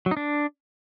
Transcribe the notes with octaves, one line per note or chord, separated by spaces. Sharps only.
F#3
D#4
D4